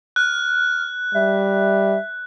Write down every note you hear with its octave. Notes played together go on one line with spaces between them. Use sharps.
F6 F#6
G3 E5